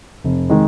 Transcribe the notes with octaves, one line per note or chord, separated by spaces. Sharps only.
F1
D#3 G#3